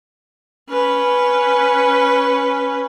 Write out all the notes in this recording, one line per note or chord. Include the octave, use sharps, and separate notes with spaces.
C#4 B4